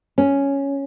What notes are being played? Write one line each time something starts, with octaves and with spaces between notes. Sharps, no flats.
C#4